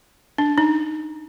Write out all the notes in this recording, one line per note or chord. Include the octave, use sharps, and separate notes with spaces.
D4
D#4